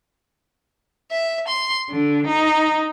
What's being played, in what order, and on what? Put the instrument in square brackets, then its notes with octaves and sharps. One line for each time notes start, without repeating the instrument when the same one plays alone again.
[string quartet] E5
C6
D3
D#4